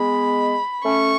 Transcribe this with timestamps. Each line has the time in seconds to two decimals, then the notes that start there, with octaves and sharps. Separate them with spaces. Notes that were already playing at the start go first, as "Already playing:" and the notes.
Already playing: G#3 B3 B5
0.84 A3 C#4 C#6